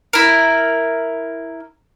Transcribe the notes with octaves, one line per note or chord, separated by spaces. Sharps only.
E4 A#4